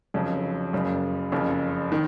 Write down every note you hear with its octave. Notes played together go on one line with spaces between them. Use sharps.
F1 F2 C#3 F#3
F#1 F#2 C#3
F#1 F2 C#3
D#3